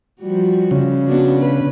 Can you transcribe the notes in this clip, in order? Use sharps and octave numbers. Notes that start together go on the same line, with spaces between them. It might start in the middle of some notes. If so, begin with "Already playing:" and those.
F3 G3 F#4
C#3
B3 D4 F#4
B4